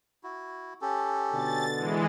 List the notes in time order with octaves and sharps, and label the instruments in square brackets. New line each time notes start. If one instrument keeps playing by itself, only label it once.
[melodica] E4 F#4
C#4 G4 A4
[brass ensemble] B2 D3 [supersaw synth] A6
[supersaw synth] E3 G#3